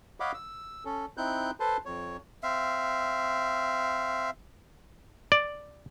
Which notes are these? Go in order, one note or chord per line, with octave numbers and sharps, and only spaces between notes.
C#5 D#5 F5 F#5 B5 D6
E6
C#4 A4
C4 D#4 E4 F#6 G6
A4 B4 C5 A5 C6
F2 C#5
C4 E5 F5
D5